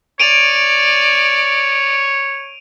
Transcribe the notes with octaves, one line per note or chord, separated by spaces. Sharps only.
C#5 D5 D7 D#7 F7